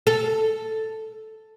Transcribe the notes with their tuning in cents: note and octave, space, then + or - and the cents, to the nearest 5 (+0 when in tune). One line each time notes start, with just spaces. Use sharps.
A4 +0